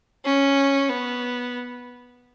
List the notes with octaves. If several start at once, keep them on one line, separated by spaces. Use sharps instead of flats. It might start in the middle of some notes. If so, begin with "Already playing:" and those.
C#4
B3